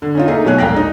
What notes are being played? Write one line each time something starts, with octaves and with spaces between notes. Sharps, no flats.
D3
C#4 D#4 F4
A3 A#3 D#4 G#4
B2 F#3 C#5 G#5 F#6
E1 A#1 F5 G5 F#6 A#6
D#4